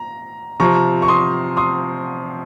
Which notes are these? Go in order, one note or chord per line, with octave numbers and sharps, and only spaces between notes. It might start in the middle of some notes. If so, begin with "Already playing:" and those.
Already playing: A#5
C3 F3 C4 A#5 C#6
C#6
C6 D#6
C6 D#6